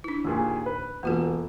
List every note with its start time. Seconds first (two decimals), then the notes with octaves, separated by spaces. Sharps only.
0.04 D4 E4
0.25 D#2 A#2 G#4
0.66 B4
1.03 E1 A#3 F4 A4